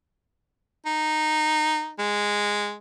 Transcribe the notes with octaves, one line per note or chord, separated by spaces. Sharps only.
D#4
G#3